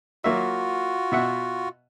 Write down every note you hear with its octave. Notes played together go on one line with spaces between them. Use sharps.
F#3 A#3 F4 F#4 E5
B2 E5 F#5